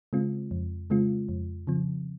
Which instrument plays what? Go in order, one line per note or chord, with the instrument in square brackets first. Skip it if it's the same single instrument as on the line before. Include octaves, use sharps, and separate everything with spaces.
[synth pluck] C#3 G#3 C4 F4
F2
C#3 G#3 C4 F4
F2
C#3 F3 C4